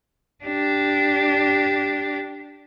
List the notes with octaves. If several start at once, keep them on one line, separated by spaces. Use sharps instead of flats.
D4 G4